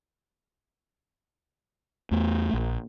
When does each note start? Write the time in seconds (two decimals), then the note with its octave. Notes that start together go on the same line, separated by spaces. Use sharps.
2.11 E2 A3
2.54 A#1